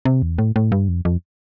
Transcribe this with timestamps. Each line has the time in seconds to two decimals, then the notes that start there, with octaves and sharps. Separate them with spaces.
0.05 C3
0.22 E2
0.38 A2
0.56 A2
0.72 G2
0.88 F2
1.05 F2